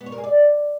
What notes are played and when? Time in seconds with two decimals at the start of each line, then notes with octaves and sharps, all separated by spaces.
0.01 B3
0.06 C#5
0.12 A#4
0.18 G#4
0.24 D5